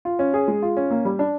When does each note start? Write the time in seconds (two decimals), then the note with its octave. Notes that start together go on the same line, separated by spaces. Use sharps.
0.05 F4
0.19 C#4
0.34 G#4
0.48 G#3
0.62 F4
0.77 C#4
0.91 A#3
1.05 G3
1.19 D4